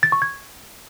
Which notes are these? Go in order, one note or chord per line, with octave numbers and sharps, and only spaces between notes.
A6
C#6
G#6